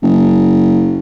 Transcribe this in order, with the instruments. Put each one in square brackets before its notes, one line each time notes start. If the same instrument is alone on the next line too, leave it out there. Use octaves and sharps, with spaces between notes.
[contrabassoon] F#1